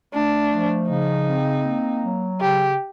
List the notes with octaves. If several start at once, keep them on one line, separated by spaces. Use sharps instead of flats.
A3 D4
F3
C#3 D#4
C4
A#3
F#3
C#3 G4